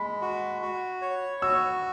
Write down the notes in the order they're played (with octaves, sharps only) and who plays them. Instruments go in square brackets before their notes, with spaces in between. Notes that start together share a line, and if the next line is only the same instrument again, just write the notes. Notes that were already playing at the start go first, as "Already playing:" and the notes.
Already playing: [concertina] G#3 [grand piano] B5
[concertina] F#4
F#4
C#5
[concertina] F#4 [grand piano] E6